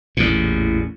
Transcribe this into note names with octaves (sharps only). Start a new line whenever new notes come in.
A1 E2 A#2